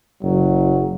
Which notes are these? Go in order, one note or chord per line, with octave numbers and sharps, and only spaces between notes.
F#1 F#3